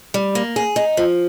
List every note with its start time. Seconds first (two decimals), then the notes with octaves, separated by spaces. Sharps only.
0.14 G3
0.35 A#3
0.56 G#4
0.76 D#4
0.97 F3